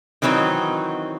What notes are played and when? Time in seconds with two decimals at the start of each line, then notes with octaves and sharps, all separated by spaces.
0.22 D#3 E3 F#3 C4 D#4